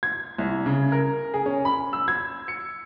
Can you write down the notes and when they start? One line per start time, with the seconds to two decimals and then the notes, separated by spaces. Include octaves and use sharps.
0.03 G#6
0.38 C2
0.66 C#3
0.92 A#4
1.34 G#4
1.46 C#4
1.65 B5
1.93 E6
2.08 G#6
2.48 C#7